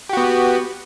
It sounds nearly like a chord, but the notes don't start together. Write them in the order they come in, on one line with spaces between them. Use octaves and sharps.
G4 F#4 B3